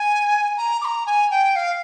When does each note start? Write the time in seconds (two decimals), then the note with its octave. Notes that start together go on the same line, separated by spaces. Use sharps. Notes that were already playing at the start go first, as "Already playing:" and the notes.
Already playing: G#5
0.57 A#5
0.81 D6
0.85 A#5
1.06 G#5
1.30 G5
1.56 F5